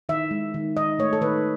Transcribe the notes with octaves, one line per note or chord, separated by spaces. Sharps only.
D#3 E5
G#3
D#3
D#3 D#5
A3 C#5
A4
D#3 B4